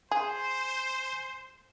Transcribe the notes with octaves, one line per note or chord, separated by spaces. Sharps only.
G#4 C5 G#5